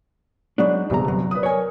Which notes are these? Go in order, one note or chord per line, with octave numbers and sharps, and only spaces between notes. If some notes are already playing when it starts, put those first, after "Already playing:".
F#3 G#3 B3 D4 D#4
G1 E2 C3 A#5
F#3
B4 D5 D#6
A#4 C#5 G#5